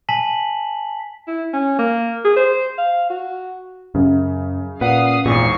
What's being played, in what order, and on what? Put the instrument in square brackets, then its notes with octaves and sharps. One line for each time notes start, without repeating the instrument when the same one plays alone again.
[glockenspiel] G#5 A5 B6 F#7
[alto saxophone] E4
C#4
A#3
G#4
C5
F5
F#4
[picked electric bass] F#2 [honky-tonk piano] C#3
[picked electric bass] A#2 [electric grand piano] B4 F#5 [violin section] F5 D#6 C7
[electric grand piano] G#1 E2 [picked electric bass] A#2 [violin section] C#6 C7